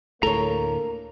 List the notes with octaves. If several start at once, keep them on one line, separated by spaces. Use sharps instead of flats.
D2 A2 A#3 A4 A#4 C#5 A#5